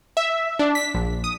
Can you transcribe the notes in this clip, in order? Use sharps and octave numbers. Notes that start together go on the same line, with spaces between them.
E5
D4
B6
A#1
D#6